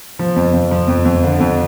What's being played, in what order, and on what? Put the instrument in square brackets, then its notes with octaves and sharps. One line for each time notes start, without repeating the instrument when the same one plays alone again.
[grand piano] F3
F2
F2
F3
F2
F2
D3
F2